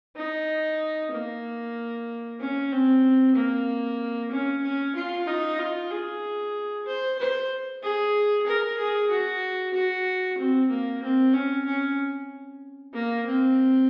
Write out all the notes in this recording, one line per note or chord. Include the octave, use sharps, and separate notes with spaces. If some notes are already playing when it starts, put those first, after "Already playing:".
D#4
A#3
C#4
C4
A#3
C#4
C#4
F4
D#4
F4
G#4
C5
C5
G#4
A#4
G#4
F#4
F#4
C4
A#3
C4
C#4
C#4
A#3
C4